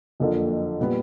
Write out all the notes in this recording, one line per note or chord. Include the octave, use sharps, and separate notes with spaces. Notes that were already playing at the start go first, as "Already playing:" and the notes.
F#1 F2 D3 F3 A#3
A#2 G3 B3